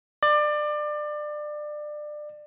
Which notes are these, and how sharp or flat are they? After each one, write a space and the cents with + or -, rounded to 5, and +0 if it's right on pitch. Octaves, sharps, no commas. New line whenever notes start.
D5 +25